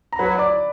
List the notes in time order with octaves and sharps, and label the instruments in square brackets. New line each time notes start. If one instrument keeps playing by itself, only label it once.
[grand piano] A#5
[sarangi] F#3 [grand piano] B4 B5
[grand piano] D5 D6